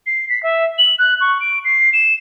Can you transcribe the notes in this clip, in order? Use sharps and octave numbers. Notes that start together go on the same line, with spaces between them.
C7
B6
E5
F#7
F#6
C#6
D7
C7
E7